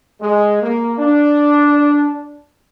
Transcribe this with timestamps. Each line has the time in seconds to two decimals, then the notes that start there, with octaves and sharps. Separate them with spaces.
0.21 G#3
0.63 A#3
0.99 D4